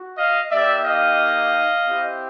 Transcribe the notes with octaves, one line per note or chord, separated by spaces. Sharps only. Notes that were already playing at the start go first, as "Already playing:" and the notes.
Already playing: F#4
D#5 F5
A#3 D#4 G4 D5 E5
D#5 F5
C4 E4 G4